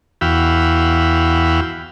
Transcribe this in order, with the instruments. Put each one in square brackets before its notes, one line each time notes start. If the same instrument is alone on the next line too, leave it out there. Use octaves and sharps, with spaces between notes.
[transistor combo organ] E2 F#4 F5 G5 B5 E6